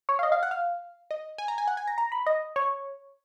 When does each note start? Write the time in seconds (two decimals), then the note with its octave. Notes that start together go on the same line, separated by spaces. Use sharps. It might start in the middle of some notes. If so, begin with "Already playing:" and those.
0.09 C#5
0.19 F5
0.23 D#5
0.32 F5
0.43 F#5
0.51 F5
1.11 D#5
1.38 G#5
1.48 A#5
1.58 G#5
1.67 F#5
1.77 G#5
1.87 A#5
1.98 A#5
2.12 B5
2.26 D#5
2.56 C#5